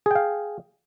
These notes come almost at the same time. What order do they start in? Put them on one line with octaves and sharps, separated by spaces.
G#4 G5 F5